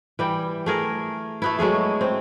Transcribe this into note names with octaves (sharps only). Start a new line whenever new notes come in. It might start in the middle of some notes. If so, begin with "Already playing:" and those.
E3 G3 G5
A3 G#4 A#4
A3 B3 E4
F#3 G#3 A3 G#4
C4